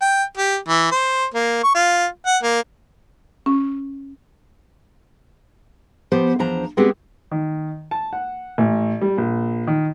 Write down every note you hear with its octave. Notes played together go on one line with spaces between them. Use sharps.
G5
G4
E3
C5
A#3
C#6
F4
F#5
A#3
C#4
F3 B3 G4 C5
E2 F3 D4 C5 A#5
G#3 B3 C4 D4 G4 G#4
D#3
A5
F#5
A1
G3
A#1
D#3